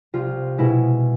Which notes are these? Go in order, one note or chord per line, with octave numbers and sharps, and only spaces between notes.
C2 F4
B2 G#3 E4